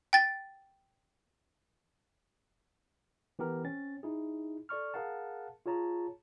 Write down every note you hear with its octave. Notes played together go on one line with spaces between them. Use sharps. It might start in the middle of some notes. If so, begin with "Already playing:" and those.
G5 A6
E3 B3 G4 A#4
C4 C#4 A6
D#4 E4 G#4
A4 D5 C#6 F6
G#4 A#4 F5 F#5 A5
F4 G#4 C#5 A5 A#5